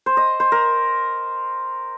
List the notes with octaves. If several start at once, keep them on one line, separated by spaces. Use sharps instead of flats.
C5
D#5
C5
A#4